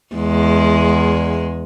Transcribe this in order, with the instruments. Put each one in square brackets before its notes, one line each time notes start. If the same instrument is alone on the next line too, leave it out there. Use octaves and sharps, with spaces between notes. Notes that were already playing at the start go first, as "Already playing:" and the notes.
[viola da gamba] E2 G#3